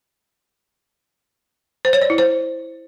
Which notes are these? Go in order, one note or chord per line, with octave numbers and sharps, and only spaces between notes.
C5
C#5
D5
E4
C5